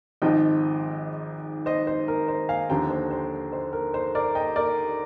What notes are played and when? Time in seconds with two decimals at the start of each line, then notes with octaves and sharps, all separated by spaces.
0.22 G#1 G#2 F3 D#5 G5
1.66 C5 D#5
1.87 C5
2.08 A#4
2.28 C5
2.49 F5 G#5
2.69 D#2 D3 F3 G5 A#5
2.90 C5
3.11 C5
3.53 C5
3.73 A#4
3.94 C5
4.15 A#4 D5
4.35 D#5 G5
4.56 A#4 D5